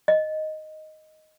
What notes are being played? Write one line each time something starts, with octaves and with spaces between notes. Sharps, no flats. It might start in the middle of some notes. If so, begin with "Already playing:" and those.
D#5